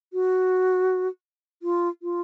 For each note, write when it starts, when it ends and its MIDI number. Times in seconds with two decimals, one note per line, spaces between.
0.13 1.08 66
1.62 1.89 65
2.03 2.21 65